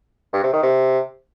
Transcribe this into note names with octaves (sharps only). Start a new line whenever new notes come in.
G2
C3
D#3
C3